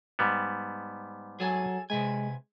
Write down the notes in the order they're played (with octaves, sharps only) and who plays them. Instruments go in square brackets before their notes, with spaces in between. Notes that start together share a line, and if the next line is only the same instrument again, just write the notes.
[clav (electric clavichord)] G#2 G3 B3
[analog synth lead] F#3 [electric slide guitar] G#4 A4 G#5
[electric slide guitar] C3 B4 G#5 [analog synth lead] G#3